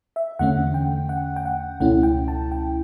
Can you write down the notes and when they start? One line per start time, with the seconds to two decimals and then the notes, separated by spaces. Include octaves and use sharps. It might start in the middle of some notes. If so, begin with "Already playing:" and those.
0.16 E5
0.39 E2 D3 A3 C#4 F#5
0.74 G5
1.09 F#5
1.36 G5
1.45 F#5
1.80 C#2 B2 A3 C#4 E4 F#5
2.03 G5
2.28 A5
2.52 G5